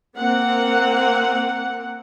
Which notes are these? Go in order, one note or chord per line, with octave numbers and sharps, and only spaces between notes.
A#3 C4 F#5